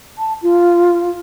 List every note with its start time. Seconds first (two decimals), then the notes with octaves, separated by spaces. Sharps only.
0.18 A5
0.43 F4